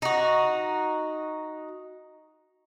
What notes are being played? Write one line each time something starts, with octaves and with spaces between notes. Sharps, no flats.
D#4 F#4